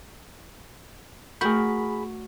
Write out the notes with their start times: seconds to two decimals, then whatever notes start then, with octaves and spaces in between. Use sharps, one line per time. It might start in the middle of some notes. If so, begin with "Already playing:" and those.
1.41 A3 F#4 G#4 A#4 B5 G6